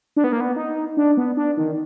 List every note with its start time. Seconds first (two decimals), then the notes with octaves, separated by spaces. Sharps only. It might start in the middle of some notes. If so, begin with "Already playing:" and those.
0.17 D4
0.24 B3
0.32 A#3
0.40 B3
0.56 D#4
0.97 D4
1.17 B3
1.37 D4
1.57 D#3